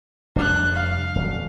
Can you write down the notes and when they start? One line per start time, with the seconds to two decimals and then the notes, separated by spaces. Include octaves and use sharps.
0.36 F1 G3 D4 F#6
0.74 F5
1.15 D#1 F#3